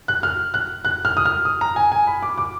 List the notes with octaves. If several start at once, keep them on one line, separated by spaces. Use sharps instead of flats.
F#6
F6
F#6
F#6
F6
D#6
F6
D#6
A#5
G#5
G#5
B5
D6
D6